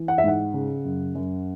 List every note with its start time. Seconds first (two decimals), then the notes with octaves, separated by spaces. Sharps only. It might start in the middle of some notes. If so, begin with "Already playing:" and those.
Already playing: E3
0.08 F#5
0.18 E5
0.24 G#2 F#5
0.54 C#3
0.85 F#2
1.15 F#2